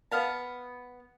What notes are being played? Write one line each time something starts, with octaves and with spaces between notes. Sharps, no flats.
B3 F5 A5